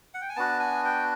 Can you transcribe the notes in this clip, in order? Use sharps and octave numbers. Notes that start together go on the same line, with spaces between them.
F#5
G5
G#5
B3 D4 F#4 A5
G#5
G5